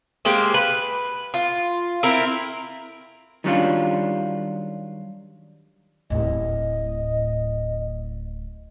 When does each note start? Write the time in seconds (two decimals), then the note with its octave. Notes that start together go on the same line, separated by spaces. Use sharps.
0.25 G#3 A#3 G4 C5
0.54 B4
1.34 F4
2.03 C4 E4 A#4
3.44 D#3 F#3 G3 C#4 D4 F4
6.10 D1 A2 D#5